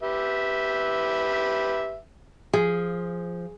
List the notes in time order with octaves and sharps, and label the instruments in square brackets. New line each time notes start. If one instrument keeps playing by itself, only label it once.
[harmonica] G4 B4 E5
[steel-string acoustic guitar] F3 [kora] G#4